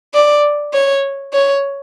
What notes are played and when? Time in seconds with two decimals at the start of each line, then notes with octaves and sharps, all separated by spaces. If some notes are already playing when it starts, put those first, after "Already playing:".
0.14 D5
0.73 C#5
1.33 C#5